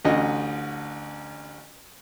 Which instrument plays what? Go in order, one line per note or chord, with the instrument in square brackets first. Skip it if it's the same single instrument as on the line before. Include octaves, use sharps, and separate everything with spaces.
[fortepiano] A1 D2 D3 D#5